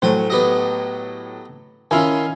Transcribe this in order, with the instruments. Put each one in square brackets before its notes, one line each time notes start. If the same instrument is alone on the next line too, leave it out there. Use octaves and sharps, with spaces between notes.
[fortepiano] A2 F#3 A3 [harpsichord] C5 G5 G#5
[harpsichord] B3 G4 D#5
[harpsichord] D#3 E4 F4 [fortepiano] C#4 F5 G#5